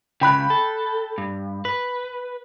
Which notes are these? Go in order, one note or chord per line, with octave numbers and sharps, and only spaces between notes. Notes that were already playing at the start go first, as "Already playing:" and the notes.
C#2 C#3 G5 B5 F#6
A4
G2
B4